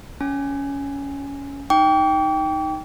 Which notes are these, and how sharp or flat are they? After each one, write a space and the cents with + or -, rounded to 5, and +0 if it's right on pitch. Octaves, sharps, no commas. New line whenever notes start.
C#4 +15 G#5 +0
D#4 +0 G5 +0 D6 -45